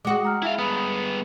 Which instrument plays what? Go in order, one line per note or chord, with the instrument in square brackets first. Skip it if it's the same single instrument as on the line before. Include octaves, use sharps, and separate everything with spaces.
[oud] G#3 F#4 [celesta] D6 C#7
[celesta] A#5 F6
[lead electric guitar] E4 F5 [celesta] E5 G#5 E6
[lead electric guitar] G2 B3 [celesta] B5 D#6